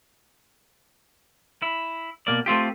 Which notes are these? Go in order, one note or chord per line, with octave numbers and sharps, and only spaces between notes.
E4
B2 A#3 D5
A3 C4 F4 G4